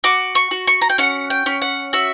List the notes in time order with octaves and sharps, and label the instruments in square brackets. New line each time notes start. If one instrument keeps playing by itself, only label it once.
[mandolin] F#4 D6
C#6
F#4
C#6
A#5
G5
C#4 F#5
G5
C#4
F#5
F#4 E5